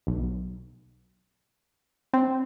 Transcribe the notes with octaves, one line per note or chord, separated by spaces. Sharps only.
B1
C4